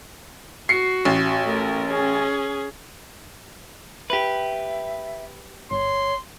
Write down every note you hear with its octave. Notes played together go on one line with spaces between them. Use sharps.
F#4 C7 C#7
A1
A3 A#4
C#4 G#4
G4 B4 E5
G1 C#5 C6